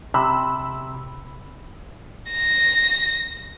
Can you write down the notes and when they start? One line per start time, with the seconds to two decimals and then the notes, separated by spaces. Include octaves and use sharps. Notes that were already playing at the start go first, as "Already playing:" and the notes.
0.14 C3 B5 E6
2.31 A#6